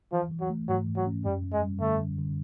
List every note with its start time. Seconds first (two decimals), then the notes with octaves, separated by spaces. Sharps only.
0.12 E3 F3
0.31 E3
0.40 F#3
0.50 A3
0.68 G#2 F#3
0.87 E3
0.96 F#3
1.06 C#4
1.25 F#2 G3
1.44 F#2
1.53 G#3
1.63 G3
1.81 D3 A3
2.00 D3
2.18 D3